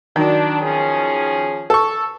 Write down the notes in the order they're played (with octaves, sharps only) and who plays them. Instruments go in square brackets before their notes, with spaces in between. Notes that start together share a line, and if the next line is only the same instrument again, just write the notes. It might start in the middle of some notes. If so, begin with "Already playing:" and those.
[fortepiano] D#3 F#3 [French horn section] D4
[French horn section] F3 C#4 G#4
[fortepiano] A4 C#6